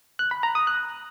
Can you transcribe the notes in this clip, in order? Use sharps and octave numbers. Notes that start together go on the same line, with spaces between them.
F#6
B5
A#5
D#6
F#6